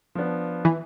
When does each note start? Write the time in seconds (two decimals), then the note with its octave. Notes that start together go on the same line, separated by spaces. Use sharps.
0.15 F3 B3 D4
0.65 E3